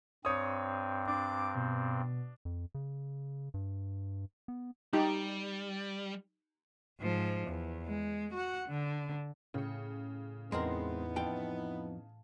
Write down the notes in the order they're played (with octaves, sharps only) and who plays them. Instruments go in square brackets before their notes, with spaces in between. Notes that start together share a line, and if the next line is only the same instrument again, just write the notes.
[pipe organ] G2 C4 [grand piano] C#5 D#6
[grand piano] D4 [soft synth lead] D6
[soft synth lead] B2
[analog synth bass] F2
C#3
G2
B3
[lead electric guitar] G3 [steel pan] D#4 G4
[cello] G#2 F3
E2
G#3
F#4 F#5
D3
[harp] A2 C#7 [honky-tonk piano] C#3
[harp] E2 [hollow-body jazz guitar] G#3 C4 A#4 [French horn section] B3 D#4 E4
[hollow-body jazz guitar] F2 G5 [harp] F5 A5 A6